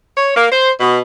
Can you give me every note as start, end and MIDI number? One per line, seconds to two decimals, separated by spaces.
0.16 0.32 73
0.35 0.47 58
0.51 0.70 72
0.79 0.99 47